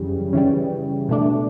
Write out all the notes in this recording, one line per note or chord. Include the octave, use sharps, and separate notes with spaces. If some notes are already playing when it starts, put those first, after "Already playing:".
Already playing: F#2 C#3 E3 G3
C#3 E3 G3
B2 A3 D4